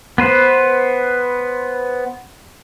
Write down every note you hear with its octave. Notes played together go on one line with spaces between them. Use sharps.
B3 B4 C5